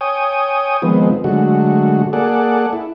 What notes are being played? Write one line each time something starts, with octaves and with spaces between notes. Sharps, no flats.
C#5 G5 G#5 D#6
D#3 F3 G#3 B3 C4
D3 F#3 G#3 A3 F#4
A#3 G#4 A4 D5 F#5
E4